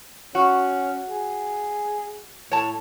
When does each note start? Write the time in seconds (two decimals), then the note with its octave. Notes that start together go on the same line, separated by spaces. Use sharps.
0.35 C#4 F#4
1.10 G#4
2.52 A2 C#5 A5